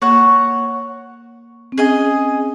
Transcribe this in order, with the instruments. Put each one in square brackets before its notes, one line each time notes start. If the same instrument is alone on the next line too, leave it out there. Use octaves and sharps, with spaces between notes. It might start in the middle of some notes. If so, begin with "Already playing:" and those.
[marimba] A#3 [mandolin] F#4 C#5 F#5
[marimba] C4
[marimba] C#4 [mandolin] G#4 D#5 G#5